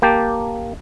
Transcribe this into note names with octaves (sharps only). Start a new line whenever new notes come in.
A#3 G4 G5 A5